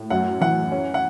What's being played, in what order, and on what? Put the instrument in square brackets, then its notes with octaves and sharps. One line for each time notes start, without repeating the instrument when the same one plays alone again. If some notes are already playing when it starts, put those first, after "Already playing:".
Already playing: [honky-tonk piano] A2
[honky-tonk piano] F#2 [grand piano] F#5
[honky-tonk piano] E3 [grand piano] F#5
[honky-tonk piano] C#4
[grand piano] F#5